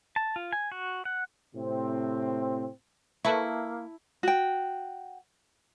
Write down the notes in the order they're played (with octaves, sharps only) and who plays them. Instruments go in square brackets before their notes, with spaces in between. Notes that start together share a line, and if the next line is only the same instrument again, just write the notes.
[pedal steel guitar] A5
F4
G#5
F#4
F#5
[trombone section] A2 C3 C4
[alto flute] A#3 [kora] E4 [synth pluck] A4 B4 C#6 [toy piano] E5 A5
[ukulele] F#4 G5